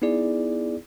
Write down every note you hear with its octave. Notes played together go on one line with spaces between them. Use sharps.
B3 D#4 E4 G#4 D5